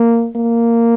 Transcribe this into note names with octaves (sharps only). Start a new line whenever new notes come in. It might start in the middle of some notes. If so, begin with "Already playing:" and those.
Already playing: A#3
A#3